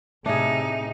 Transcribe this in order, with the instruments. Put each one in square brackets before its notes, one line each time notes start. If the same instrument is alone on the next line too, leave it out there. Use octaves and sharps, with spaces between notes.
[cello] A2 D#4 [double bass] C3 [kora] D4 G#4 [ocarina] E5